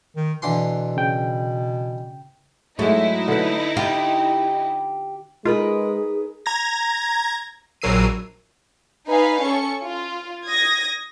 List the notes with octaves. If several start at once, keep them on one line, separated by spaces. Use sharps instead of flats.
D#3
B2 D3 E3 C6
C#3 G5
G#2 F#3 G#3 A3 D#4 E4 D#5
D3 B4
F4 G4
G#3 D#4 F4 G#4 A#4 B4
A#5 G#6 A#6
A#1 F#3 A#4 E6 C7 D#7
D#4 B4 F5 G#5 B5
C#4 A4 C#6 C#7
F4
D#6 G#6 A#6